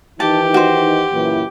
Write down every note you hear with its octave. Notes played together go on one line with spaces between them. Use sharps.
D#3 E3 D#4 G4 A5
F#4 C5
F#2 A#2 E3